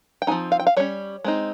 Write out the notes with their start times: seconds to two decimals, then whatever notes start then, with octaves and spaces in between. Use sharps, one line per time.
0.22 G5
0.27 F3 C4 D#4 G#5
0.52 F5
0.60 G5
0.67 F5
0.77 G3 C#4 C#5
1.24 G#3 C4 D#4